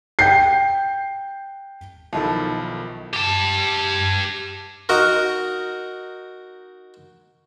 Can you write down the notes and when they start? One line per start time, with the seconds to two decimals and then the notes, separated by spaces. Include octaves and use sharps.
0.19 G5 G6 C7
2.13 B1 D#3 F3 E4 A4
3.14 G4 A5
4.89 D#4 F#4 A#4